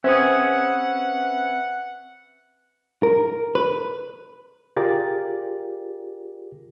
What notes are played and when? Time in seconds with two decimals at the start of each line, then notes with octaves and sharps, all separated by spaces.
0.04 C4 C#4 G#4 B4 E5 F#5
3.03 A#4
3.55 B4
4.76 F4 G4 G#4 A#4 D5 A6